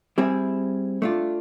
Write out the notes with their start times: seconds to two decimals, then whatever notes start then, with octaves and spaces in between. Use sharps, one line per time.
0.18 G3 C4 E4 G#4
1.02 A3 D4 F4